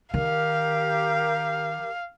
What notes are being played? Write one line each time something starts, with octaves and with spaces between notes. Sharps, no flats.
D#3 G4 A#4 F5